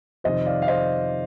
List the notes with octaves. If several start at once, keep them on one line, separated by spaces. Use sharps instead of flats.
F2 C3 D#3 C5 D#5
D5 F5
F5
C5 D#5